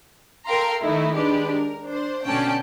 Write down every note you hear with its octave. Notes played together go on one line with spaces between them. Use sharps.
A4 A#4 F5 G5 A#5 C6
D#3 A3 D#4 E4
G#3 D4 G4 B4
A#4
D4 C5
B2 D3 C#4 D5 G5 A5